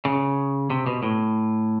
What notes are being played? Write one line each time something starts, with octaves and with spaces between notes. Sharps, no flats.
C#3
C3
B2
A2